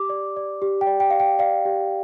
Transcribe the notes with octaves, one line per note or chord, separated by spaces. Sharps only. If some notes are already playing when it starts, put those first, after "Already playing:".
Already playing: G4 D6
D5
D5
G4
G5
D5
G5
D5 F5
G5
D5 F5
G4